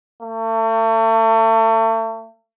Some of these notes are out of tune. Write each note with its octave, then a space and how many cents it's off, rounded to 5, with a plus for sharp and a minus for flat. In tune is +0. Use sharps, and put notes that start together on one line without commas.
A3 +35